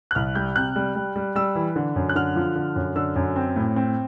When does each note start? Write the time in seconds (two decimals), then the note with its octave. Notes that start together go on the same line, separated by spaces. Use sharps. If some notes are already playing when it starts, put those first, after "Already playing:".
0.11 F#6
0.15 C2 F6
0.35 G3 G6
0.56 C3 F#6
0.76 G3
0.95 G3
1.16 G3
1.35 G3 E6
1.55 E3
1.76 D3
1.96 F#2
2.09 F#6
2.15 D3 F6
2.36 F3
2.56 D3
2.76 F#2
2.96 D3 E6
3.16 F#2
3.36 C4
3.56 A2
3.76 C4